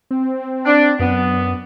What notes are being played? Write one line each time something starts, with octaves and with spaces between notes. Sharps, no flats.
C4
D4
F#2 B3